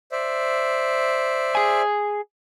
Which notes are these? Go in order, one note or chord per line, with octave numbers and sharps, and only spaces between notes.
C5 D5 E5
G#4 G#5